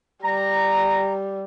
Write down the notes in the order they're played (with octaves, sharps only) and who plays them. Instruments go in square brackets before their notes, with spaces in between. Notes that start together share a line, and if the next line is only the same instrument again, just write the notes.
[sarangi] G3 [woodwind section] A#5